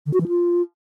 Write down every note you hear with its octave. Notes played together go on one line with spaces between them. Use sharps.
D3
F#4
E3
F4